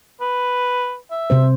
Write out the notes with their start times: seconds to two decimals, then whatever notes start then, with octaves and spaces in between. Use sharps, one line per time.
0.21 B4
1.11 E5
1.30 C3 C4 C5